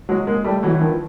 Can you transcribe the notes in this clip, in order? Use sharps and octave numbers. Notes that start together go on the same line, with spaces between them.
F#3 G#3
G#3 A#3
G3 A3
E3 F#3
E3
D#3 F3